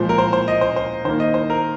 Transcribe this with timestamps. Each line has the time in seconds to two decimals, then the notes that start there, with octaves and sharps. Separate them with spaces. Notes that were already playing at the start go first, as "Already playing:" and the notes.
Already playing: A#2 F3 G#3 C5
0.09 A#4
0.18 C5
0.33 C5
0.48 D#5
0.61 C5
0.76 C5
1.05 D#3 A#3 C5
1.20 D#5
1.34 C5
1.50 A#4